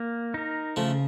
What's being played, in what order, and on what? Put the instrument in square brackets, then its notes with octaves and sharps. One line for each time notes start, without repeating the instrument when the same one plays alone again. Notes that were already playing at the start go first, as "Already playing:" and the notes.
Already playing: [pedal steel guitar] A#3
D#4 A#4
[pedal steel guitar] C#3 [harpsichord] F3 A3